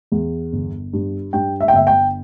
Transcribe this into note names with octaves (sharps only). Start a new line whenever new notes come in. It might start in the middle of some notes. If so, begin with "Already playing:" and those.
E2
G1
G2
G2 G5
E5
G5
G1 E5
G5